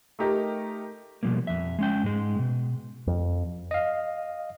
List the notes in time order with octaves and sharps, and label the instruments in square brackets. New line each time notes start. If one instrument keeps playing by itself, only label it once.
[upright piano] A3 D#4 G4 A#4
[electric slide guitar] B2 F3 G3 A#3
F2 E5
G#3 C#4 G5
G#2 G#3
B2
[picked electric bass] F2
[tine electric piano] D#5 F5